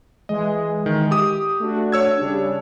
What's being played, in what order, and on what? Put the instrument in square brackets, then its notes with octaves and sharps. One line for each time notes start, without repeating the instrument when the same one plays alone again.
[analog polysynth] E3 G#3 [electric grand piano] D#5
[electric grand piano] D#3
G4 D#6
[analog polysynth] A3 D4 F#4
[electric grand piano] C#5 E6 G#6
[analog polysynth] C#3 G3 D4